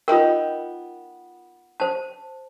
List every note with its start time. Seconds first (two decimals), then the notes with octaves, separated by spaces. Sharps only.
0.08 B3 D#4 F4 A#4 G5
1.80 C5 A5